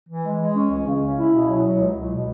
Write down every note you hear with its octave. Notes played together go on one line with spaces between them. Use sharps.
E3
G#3
G#3
C#4
C#2
C#3
C#4
E4
B2
F#3
F#3
C#2
C#2
B2